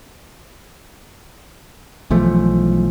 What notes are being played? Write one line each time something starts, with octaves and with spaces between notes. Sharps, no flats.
B1 E3 F3 A3